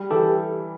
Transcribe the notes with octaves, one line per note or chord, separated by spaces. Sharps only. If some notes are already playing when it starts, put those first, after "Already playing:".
Already playing: G3
E3 G4 A4